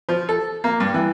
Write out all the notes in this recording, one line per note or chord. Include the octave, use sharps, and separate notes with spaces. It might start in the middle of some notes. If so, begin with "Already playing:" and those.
F3
A4
A#3
G2
E3